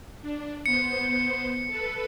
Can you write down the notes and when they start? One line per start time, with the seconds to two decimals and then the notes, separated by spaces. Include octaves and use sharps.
0.22 D4
0.66 B3 C5 C#7
1.67 A4 B4